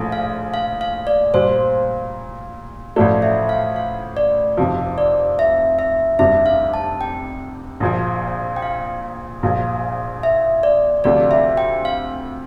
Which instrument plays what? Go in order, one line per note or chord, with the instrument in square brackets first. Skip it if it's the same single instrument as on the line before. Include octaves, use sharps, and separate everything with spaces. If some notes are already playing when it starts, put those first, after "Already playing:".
Already playing: [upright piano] A#1 A2 F3 A3
[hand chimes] F5
F5
F5
D5
[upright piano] A#2 G3 A#3 [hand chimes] C5
[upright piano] A1 A2 F3 A3 [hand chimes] D5
[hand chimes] E5
F5
F5
D5
[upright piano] F1 F2 C3 F3
[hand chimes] D5
E5
E5
[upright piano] F1 F2 C3 G3 D4 [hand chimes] E5
[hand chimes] F5
A5
G5
[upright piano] A#1 A#2 F3
[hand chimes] G5
F5
[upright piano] A#1 A#2 F3
[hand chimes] E5
D5
[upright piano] D2 C3 F3 A3 [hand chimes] D5
[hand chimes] E5
G5
F5